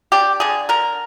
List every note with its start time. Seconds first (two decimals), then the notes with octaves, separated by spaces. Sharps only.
0.12 D4 G4
0.40 D3 G#4
0.69 D3 A#4